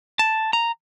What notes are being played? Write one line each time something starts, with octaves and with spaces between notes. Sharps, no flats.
A5
A#5